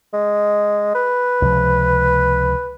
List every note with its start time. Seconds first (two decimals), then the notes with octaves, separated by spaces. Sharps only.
0.13 G#3
0.95 B4
1.42 C#2 C3 F3